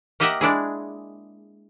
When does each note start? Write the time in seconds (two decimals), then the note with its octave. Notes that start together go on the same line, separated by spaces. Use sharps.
0.20 A#3 G4 D#5 E5 F#5
0.41 G#3 D4 E4 G#4